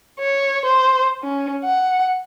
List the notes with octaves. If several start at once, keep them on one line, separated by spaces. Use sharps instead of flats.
C#5
C5
C#4
F#5